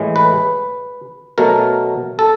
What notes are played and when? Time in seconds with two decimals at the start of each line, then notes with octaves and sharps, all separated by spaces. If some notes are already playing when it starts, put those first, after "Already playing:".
Already playing: A2 E3 G#3
0.16 B4
1.38 B2 F#3 A3 A#4
2.19 A4